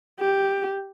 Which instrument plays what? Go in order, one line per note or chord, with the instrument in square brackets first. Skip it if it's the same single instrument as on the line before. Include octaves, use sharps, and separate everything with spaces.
[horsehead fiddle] G4